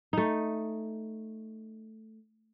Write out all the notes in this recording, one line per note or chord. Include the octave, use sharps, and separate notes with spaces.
A3 D#4